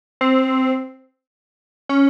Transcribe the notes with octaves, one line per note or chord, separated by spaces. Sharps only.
C4
C#4